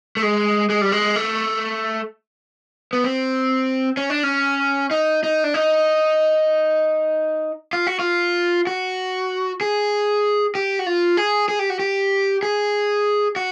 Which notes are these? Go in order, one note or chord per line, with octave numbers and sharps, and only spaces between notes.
A3
G#3
G#3
G3
G#3
A3
B3
C4
C#4
D4
C#4
D#4
D#4
D4
D#4
F4
F#4
F4
F#4
G#4
G4
F#4
F4
G#4
G#4
G4
F#4
G4
G#4
F#4